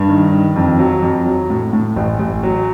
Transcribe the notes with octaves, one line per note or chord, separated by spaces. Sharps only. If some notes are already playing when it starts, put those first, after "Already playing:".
Already playing: G2
D#3
D#3
F2
F#3
F2
F#3
A2
A2
A1
A1
F#3